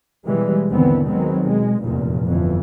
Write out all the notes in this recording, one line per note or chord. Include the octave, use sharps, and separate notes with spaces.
B2 E3 G3 G#3
D#2 G#2 D3 E3 B3 C4
D#3 F#3 G#3 B3 C4
B2 G#3
F1 E2 G2 A#2
G1 F2 E3 F3